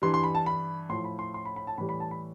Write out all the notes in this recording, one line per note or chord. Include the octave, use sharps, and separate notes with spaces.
G2 E3 G3 C6
C6
B5
A5
B5
A2 F3 C6
B5
C6
C6
B5
B5
A5
A2 E3 G3 B5
B5
A5
B5